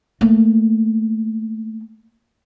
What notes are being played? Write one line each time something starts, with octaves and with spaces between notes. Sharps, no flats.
A3 A#3